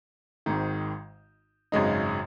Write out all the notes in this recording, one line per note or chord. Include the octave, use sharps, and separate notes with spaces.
G#1 G#2 D#3
G#1 F#2 C#3 G#3 D#4